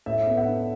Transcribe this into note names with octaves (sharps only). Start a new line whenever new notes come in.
A2 E5
B3
F#5
D4